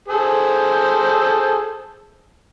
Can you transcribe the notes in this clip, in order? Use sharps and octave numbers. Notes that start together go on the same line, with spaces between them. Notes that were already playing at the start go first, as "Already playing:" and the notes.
G#4 A4 C5